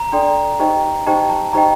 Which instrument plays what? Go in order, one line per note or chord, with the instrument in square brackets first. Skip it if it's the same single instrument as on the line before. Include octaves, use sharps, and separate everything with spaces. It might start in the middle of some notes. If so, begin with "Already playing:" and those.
Already playing: [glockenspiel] A#5
[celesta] D4 A4 D5 G5 C6
D#4 G4 C5 D#5 G5
[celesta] D#4 G4 C5 D#5 G5 [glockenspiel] A5
[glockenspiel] A5
[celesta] D#4 G4 C5 D#5 G5 [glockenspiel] A#5